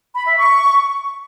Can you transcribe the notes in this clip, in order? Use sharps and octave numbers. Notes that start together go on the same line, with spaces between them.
B5
E5
C#6